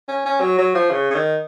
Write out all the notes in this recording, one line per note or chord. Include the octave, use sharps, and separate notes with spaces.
C#4
C#4
F#3
F#3
F3
C#3
C#3
D#3